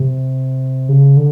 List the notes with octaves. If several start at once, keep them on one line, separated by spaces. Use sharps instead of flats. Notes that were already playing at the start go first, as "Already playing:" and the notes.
Already playing: C3
C#3
D3